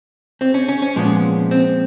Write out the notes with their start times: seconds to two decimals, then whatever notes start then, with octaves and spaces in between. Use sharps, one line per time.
0.41 C4
0.54 C#4
0.68 C#4
0.82 C#4
0.96 A#2 F3 G#3 B3
1.51 C4